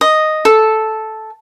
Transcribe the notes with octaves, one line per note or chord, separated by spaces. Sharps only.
D#5
A4